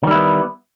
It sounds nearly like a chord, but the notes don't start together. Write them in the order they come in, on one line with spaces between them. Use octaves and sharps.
D#3 G3 E4 B3